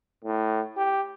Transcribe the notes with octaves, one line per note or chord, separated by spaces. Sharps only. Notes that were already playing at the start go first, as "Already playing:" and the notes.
A2
G4